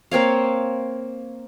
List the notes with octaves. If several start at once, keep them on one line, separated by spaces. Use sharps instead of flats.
A#3 C4 C#5 F5